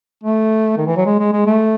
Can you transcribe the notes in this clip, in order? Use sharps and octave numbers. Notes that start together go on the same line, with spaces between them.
A3
D#3
E3
F#3
G#3
G#3
G#3
A3